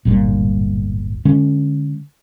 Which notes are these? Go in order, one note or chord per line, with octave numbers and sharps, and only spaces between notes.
D1 G1 A#2 G3
D3 G#3 C#4